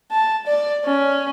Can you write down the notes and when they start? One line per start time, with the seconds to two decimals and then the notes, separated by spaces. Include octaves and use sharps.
0.12 A5
0.47 D5
0.85 C#4